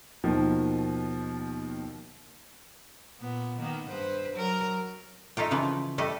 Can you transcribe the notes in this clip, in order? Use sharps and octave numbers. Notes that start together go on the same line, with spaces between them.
D#2 B2 D#3 F3
A#2 B3
D#3 A#3 B3
G2 B4 C5
F#3 A#4
A3 D#4 F4 G5
C#3 E3 F3
G3 A3 D#5 G5